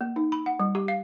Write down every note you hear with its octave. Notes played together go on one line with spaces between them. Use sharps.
A#3
D#4
B5
F#5
G3
G4
F5